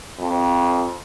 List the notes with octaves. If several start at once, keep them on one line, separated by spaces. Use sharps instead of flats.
F2